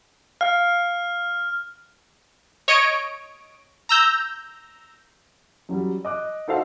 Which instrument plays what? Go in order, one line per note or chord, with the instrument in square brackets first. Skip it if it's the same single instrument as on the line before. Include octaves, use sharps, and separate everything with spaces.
[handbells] F5 [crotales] F6
[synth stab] C#5 D#5 D7
A#5 E6 G6
[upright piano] F#2 F#3 G3
D#5 D6 F#6
D#4 F#4 A4 C5 E5 F5